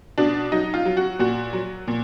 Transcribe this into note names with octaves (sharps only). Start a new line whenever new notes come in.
B2 D4
F#3 D#4
F4
F#3
F#4
A#2 F#4
F#3
A#2